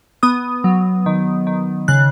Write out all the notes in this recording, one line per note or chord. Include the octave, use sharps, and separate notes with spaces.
B3 D#6
F#3
D#3
D#3
C#3 F#6